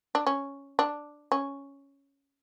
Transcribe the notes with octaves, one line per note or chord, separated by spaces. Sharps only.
D4
C#4
D4
C#4